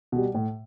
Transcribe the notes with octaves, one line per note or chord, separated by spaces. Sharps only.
B2 G3
A2